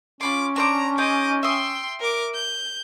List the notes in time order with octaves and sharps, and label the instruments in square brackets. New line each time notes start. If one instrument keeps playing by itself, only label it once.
[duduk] C#4 [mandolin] F4 B5 C6 [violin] D6
[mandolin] D4 C5 D6 [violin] A#5
[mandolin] D#4 G#4 C5 [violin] D#5 D6
[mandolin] E5 D#6 [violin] G5 C6
[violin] A#4 D6
G6